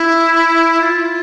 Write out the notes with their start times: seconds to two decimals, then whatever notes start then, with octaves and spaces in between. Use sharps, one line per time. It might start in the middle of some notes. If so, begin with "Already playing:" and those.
Already playing: E4
0.81 F4